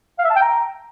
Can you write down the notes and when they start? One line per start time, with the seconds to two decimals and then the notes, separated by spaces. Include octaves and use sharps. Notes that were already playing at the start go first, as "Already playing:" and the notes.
0.19 F5
0.24 E5
0.30 A5
0.36 G5
0.42 A#5